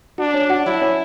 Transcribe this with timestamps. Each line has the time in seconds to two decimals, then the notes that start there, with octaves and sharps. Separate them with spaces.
0.18 D4 F#4
0.34 C#4
0.50 F#4
0.66 F#3 E4
0.82 C#4